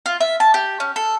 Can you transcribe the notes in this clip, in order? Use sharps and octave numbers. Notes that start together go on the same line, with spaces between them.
F4
E5
A5
G4
C#4
A4